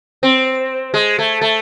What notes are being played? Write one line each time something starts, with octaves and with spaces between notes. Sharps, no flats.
C4
G#3
A3
A3